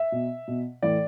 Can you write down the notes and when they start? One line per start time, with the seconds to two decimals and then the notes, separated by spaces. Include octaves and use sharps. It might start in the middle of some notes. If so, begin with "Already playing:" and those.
Already playing: E5
0.12 B2
0.47 B2
0.82 A2 E3 D5